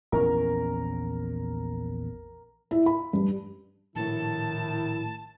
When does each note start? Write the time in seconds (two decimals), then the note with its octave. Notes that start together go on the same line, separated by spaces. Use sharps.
0.12 A#1 E2 C#4 A#4
2.71 E4
2.86 B5
3.13 G2
3.96 A#1 A2 D#3 E4 A5